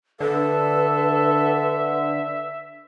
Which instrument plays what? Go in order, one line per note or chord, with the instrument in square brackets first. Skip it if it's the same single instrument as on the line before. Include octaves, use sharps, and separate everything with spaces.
[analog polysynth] D3 [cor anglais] A4 [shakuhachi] B4 [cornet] E5